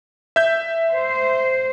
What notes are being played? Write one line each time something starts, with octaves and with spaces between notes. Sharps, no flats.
E5 G6
C5